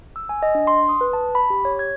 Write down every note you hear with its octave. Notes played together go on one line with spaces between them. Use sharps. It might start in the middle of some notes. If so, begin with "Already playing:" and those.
E6
G#5
D#5
D4
C6
D#6
B4
A5
B5
G4
C#5
G#6